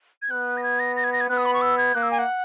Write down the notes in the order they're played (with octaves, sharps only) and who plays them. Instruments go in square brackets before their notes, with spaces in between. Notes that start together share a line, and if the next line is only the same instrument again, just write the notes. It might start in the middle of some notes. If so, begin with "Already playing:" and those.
[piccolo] G#6
[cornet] B3 [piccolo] F#6
[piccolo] A#6
G#6
A#6
A#6
G#6
A#6
G#6
[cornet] B3 [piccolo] F#6
[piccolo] D#6
B5
C#6
E6
G#6
[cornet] A#3 [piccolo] F#6
[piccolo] E6
G#5
F#5